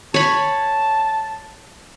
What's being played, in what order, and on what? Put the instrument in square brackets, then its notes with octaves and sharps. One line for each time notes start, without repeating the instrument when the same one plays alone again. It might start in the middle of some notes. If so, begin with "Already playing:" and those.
[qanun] C#5 B5 [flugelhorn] A5